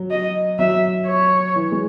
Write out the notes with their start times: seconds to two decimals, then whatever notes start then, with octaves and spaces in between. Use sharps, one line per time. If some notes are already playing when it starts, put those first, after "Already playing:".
Already playing: F#3
0.11 D#5
0.59 F#3 E5
1.07 C#5
1.56 E3
1.72 G#3